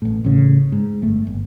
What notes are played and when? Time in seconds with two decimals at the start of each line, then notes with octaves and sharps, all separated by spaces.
0.02 A1 A2
0.24 A1 A2 C#3
0.72 G#2
1.02 G1 A3
1.27 G1